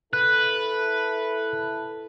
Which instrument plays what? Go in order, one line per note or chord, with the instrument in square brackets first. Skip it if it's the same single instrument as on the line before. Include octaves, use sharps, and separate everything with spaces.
[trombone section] E4 A4 [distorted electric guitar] B4 [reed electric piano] F#6